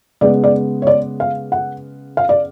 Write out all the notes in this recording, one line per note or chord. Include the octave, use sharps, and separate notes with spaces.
C#3 G#3 B3 D5
D5
C#5
D5
F5
F#5
F5
D5